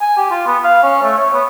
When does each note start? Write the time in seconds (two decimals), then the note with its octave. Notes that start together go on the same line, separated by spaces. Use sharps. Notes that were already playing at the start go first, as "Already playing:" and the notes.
0.01 G#5
0.17 G4
0.31 F4
0.47 B3
0.64 F5
0.83 C#4
1.02 A3
1.17 C#5
1.34 B3